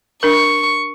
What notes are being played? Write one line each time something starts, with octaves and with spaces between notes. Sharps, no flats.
D4 A#4 C#6